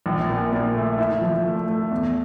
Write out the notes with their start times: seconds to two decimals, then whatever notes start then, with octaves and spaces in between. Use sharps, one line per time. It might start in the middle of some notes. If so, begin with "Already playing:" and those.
0.06 A#1
0.29 A#2
0.52 A#2
0.75 A3
0.98 E4
1.21 F3
1.45 A3
1.69 A3
1.91 E2